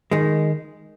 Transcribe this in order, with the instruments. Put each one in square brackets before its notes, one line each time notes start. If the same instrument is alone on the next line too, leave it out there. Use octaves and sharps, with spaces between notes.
[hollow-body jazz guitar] D#3 G#3